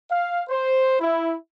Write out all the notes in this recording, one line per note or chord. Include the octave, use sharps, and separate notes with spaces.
F5
C5
E4